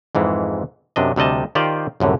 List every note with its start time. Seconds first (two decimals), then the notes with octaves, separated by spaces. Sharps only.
0.15 F2 G#2 E3 G#3
0.96 F#2 C3 D4 D#5
1.16 D2 C3 G3 D#5 A5
1.55 D#3 F4 G4 C5 D5 D#5
2.00 C2 F#2 A2 D3